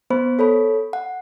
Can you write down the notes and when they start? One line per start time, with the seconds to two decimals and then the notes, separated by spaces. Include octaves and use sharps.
0.10 B3 C5 B5
0.39 A4 C#5 B5
0.93 F#5